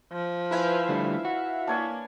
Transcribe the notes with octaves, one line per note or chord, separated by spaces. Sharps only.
F3
E4 B4 E5 F5 G#5
D3 G3 A3
F#4
A#3 D4 C#5 G#5